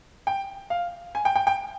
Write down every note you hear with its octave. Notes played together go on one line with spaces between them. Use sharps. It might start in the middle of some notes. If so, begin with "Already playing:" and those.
G5
F5
G#5
G5
G5
G5